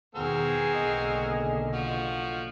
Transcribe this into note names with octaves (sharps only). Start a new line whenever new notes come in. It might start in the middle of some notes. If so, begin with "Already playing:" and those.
E2 B2 D#3 B3 C4 F#4 G#4 A#4
F#1 B1 D3 D#5
F3 F#4